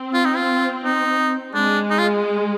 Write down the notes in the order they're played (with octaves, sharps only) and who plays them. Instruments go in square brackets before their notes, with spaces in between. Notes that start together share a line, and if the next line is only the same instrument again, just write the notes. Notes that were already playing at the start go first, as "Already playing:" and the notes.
Already playing: [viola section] C4
[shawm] F4
D#4
F4
D#4
[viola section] G#3 [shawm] D4
[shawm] D#4
F4